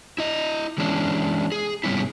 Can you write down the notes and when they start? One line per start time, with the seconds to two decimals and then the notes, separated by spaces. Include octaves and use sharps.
0.18 E4 D#5
0.78 E3 G#3 C#4 D4
1.52 G#4
1.84 G#2 C3 G3 B3 C#4 E4